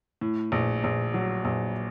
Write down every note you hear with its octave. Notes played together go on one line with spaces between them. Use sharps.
A2
A#1
A#1
F#3
A#1